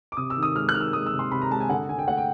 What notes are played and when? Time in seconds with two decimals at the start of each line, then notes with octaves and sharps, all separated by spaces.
0.12 D6
0.17 C3 D#6
0.30 E6
0.37 D#3
0.43 D#6
0.56 G#3 F6
0.69 F#6
0.74 D#3 F6
0.81 E6
0.93 G#3 D#6
1.06 E6
1.13 C3
1.19 C6
1.32 C3 B5
1.42 A#5
1.51 G#3 A5
1.60 G#5
1.69 D3 F#5
1.89 D3 G#5
1.99 G5
2.08 A3 F#5
2.18 G5